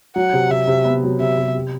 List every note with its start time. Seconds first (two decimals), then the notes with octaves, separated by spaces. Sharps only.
0.16 F#3 F#5
0.33 C3
0.51 C3 E5
0.67 C3
0.85 B3
1.03 F#3
1.20 C3 E5
1.38 C3
1.55 G4